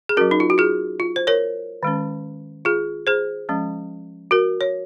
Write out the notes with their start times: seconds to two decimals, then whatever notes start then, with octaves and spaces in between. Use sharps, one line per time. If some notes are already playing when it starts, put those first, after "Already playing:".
0.09 G#4
0.17 F#3 C#4 F#4 A#4
0.31 D#4
0.40 F4
0.50 F#4
0.58 F4 G#4
1.00 F4
1.16 C5
1.27 A#4 C#5
1.83 D#3 G#3 C#4
2.65 F4 G#4
3.07 G#4 C5
3.49 F3 G#3 C#4
4.31 F#4 A#4
4.61 C#5